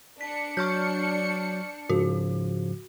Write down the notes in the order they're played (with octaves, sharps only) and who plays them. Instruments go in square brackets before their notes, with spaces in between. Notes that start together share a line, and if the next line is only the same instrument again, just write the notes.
[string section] D4 C#7 [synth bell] B6
[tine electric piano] F#3 [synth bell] C#6 F6 G6
[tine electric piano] G#2 C#3 F3 [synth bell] F#4